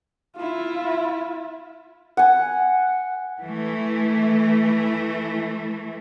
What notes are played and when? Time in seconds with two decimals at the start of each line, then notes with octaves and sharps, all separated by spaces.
0.37 E4 F4
2.17 F#5 G#5
3.41 E3 A3